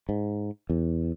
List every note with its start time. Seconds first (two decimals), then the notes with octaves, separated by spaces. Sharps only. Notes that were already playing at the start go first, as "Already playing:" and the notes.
0.09 G#2
0.70 E2